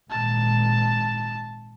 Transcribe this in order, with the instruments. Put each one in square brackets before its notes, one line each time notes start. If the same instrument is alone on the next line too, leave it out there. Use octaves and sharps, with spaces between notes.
[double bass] G#1 A#2 [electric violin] A5